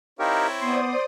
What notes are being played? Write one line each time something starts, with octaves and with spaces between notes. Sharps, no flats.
C4 D#4 E4 G4 A#4 C#5 F5
B3 C5 D5 C6 D#6